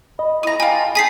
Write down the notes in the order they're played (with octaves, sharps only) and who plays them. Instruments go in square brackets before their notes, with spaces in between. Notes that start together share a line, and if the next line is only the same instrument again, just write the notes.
[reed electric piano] D#5 [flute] B5
[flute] E4 [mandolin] A#5 D#6
[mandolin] F4 G4 [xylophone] G#5 [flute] B5
[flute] A5
[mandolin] D#4 G#4 [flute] G5 [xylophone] G#5 B6 C7